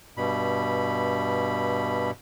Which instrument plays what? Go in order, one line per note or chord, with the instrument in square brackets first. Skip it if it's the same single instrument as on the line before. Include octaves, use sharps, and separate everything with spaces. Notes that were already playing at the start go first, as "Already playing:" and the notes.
[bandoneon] G2 B2 B5